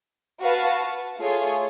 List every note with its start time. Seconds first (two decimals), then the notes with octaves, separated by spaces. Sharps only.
0.40 F#4 B4 F5 A5
1.18 A3 F4 G#4 C#5